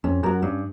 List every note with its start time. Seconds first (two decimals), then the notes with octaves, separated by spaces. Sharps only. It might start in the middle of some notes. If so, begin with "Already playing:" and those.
0.04 F2 C#4
0.23 F#2 F#4 A#4
0.42 G2 C#4